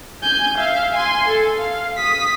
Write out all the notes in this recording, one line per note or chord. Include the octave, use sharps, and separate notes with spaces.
G#5 G6
E5 F5
G#5 C6
A4
F5
D#6 B6